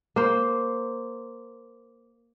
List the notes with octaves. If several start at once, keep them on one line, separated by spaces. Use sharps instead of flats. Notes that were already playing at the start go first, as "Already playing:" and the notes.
A#3 C5